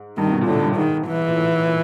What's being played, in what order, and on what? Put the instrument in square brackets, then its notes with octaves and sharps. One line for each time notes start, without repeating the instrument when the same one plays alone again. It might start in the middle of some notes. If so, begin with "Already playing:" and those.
Already playing: [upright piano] G#2
[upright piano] G2 [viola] D#3
[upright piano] C3
B2
A#2
[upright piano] A2 [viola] D3
[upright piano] G2
[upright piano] G#2 [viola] D#3
[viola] E3
[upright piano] A#2
A2
A#2